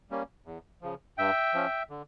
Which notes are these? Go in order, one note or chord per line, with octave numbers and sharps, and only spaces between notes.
G3 A#3 C#4
E2
C#3 F3
G2 E5 G5
F3 C#4
D3